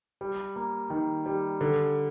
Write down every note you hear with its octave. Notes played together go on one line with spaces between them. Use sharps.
G3
A#3
D#3
G3
D3